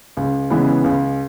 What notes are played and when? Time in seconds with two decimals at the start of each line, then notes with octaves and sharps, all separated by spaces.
0.17 C#2
0.50 C#3 E3 G#3 B3
0.84 C#2